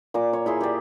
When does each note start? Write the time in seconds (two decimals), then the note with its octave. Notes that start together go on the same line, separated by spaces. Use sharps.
0.14 A#2 D6
0.33 C#5
0.46 E4 G#4 C6
0.61 G4 D5